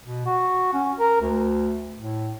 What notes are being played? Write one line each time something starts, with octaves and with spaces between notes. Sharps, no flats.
B2
F#4
C#4
A#4
D2
A2